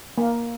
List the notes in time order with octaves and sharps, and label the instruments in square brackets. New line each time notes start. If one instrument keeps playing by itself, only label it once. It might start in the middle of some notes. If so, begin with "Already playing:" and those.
[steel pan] A#3